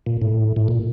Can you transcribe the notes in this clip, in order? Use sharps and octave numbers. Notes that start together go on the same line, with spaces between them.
A#2
A2
A2
A#2